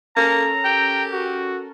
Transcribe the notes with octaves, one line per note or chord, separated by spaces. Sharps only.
A#3 C#4 A4 A#4 A#5
G4 G5
F#4